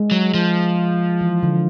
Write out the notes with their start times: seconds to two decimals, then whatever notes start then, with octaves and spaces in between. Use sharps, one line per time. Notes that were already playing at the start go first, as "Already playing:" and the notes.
Already playing: G#3
0.11 F#3
0.34 F3
1.21 E3
1.43 D3